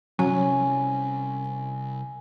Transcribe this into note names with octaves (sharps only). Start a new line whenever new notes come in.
C2 F#3 C#4 G#5